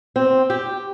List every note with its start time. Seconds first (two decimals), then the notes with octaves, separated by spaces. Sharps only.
0.16 C4
0.50 G4